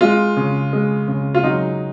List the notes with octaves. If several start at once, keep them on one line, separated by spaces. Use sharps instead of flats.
G#3 F4
C#3
G#3
C#3
F4
F#3 D#4